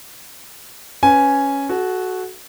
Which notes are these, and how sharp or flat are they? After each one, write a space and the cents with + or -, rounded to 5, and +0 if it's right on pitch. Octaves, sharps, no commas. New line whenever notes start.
C#4 +0 B4 +10 G#5 +0
F#4 +0 A4 -35